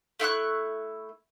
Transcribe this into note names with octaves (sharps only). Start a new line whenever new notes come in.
A3 E4 C#6 F#6